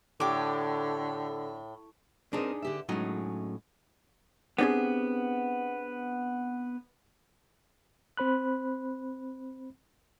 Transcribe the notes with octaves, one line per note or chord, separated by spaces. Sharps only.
A2 D3 G4 D6
C4 D4 D#4 G#4 A#4
D3 G4 E5
A2 F#3 G#3 C#4 D#4
B3 C4 D4 G4 G#4
C4 C5 B5 F#6